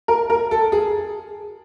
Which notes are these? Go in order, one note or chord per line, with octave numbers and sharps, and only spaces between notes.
A#4
A#4
A4
G#4